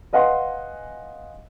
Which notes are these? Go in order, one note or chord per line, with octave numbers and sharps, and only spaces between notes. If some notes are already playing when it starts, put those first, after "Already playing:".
B4 D#5 F5 F#5 G#5 C6